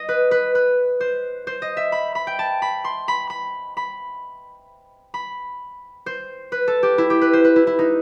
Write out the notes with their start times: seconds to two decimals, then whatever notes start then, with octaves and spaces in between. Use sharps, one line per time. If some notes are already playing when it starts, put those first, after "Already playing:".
Already playing: D#5
0.09 B4
0.31 B4
0.55 B4
1.00 C5
1.47 C5
1.62 D#5
1.77 E5
1.92 B5
2.15 B5
2.27 G5
2.39 A5
2.62 B5
2.84 C6
3.08 B5
3.30 B5
3.77 B5
5.14 B5
6.06 C5
6.52 B4
6.68 A4
6.83 G4
6.98 E4
7.10 G4
7.21 B4
7.33 C5
7.44 B4
7.56 E4
7.67 E4
7.79 D#4